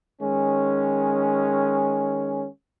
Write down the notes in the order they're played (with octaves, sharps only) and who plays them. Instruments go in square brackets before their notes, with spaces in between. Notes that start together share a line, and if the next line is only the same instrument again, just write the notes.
[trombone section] D#3 G#3 C#4